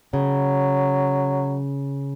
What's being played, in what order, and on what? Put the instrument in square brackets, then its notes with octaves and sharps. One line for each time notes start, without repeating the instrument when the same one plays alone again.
[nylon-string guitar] C#3 [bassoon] F#3